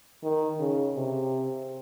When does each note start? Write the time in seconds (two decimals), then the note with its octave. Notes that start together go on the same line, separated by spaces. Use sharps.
0.23 D#3
0.59 C#3
0.96 C3